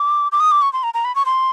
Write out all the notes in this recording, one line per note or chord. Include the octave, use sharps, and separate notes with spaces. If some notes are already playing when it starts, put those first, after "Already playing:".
Already playing: D6
D6
D#6
D6
C#6
C6
A#5
A#5
B5
C#6
C6